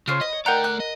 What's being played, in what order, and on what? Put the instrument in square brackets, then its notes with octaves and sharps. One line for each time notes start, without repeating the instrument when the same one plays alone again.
[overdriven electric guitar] C#3 [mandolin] F4 C5 C#5
[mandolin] B4 [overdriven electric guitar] D#5
[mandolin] C#5
[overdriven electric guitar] A3 D5 [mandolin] D#4 G5 F#6 [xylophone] A#4 F#5 A#5
[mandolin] F#6
[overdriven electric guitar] D#5